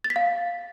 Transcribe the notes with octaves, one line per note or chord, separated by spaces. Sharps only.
A6
B6
F5